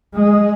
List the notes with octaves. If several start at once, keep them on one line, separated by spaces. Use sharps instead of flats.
G#3